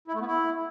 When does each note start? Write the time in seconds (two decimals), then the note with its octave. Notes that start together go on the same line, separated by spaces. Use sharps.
0.08 E4
0.14 A3
0.20 B3
0.27 E4